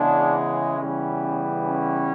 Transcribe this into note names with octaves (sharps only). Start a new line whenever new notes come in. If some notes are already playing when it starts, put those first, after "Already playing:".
Already playing: C#3 E3 G#3 B3 D4
C#4
C#3 E3 G3 B3
C#4